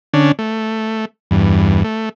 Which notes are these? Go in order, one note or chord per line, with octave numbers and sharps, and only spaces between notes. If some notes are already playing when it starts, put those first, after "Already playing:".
D3 C#4 D4
A3
E2 G2
A3